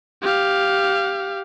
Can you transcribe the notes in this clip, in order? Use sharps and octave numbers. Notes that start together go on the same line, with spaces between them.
G4 F5